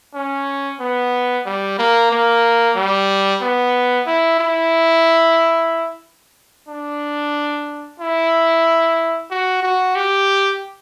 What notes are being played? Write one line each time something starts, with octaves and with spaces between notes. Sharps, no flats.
C#4
B3
G3
A#3
A#3
G3
B3
E4
E4
D4
E4
F#4
F#4
G4